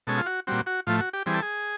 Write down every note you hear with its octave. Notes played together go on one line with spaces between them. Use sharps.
B2 G#3 C#4 A4
F4
F#4
A#2 G3 C4 F#4
F#4
A2 F3 A3 F4
F#4
G4
E3 G3 C4 G#4
A4
G#4